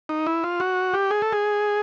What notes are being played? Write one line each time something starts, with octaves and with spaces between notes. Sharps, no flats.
D#4
E4
F4
F#4
G4
G#4
A4
G#4